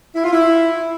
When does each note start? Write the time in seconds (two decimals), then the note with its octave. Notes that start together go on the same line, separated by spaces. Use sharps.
0.15 E4
0.24 F4
0.32 E4